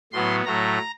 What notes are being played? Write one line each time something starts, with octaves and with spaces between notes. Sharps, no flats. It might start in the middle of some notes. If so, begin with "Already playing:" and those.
A2 F#3 B3 C6
A2 F#3 A3 A#5